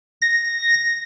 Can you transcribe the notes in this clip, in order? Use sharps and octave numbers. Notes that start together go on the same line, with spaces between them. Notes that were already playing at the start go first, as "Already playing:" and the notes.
A#6